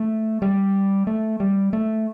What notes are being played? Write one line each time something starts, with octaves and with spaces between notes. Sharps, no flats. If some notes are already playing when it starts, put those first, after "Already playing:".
Already playing: A3
G3
A3
G3
A3